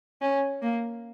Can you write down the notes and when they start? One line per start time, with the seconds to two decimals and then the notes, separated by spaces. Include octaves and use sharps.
0.22 C#4
0.62 A#3